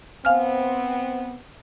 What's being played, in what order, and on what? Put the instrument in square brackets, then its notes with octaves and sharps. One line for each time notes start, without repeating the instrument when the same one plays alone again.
[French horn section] B3 C4 [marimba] F5 G#5 F6